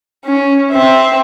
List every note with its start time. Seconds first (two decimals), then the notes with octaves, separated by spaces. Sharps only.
0.25 C#4
0.71 C4 E5